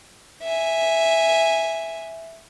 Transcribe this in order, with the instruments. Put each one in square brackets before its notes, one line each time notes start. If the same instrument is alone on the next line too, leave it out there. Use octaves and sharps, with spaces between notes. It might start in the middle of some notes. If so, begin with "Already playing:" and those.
[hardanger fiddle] E5 G#5